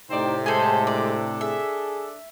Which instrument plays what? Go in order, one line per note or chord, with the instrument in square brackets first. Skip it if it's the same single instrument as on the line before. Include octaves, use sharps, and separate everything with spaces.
[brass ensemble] A2 C3 [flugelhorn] D#4 [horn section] C5 D5 G5
[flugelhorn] G#3 [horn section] G#4 C5 [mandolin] A4 G#5
[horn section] D4 A4 [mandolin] D5
[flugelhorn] G#4 [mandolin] E5